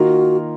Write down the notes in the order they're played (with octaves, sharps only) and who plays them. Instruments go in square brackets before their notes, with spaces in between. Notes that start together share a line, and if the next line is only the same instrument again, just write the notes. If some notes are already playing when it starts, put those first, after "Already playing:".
Already playing: [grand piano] D#3 A#3 F4 A#4 [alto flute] F#4